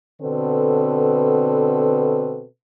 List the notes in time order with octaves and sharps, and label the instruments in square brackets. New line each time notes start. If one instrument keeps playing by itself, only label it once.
[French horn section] B2 D3 C4 A4 B4